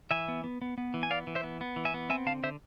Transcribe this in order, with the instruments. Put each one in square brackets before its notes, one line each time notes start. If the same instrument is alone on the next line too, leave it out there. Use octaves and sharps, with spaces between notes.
[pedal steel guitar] E3 E5 G#5
B3
B3
B3
B3
E3
G#5
B3 D5 F5
E3
C5 E5
B3
B3
E3
E5 G#5
B3
C4 E5 G#5
D3 F5 A5
D3 C5 E5